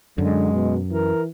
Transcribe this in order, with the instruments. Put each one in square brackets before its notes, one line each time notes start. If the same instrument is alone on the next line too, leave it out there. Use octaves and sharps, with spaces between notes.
[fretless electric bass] F#2 [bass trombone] D3 [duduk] G#3
[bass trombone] B2
[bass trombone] E3 [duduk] A#4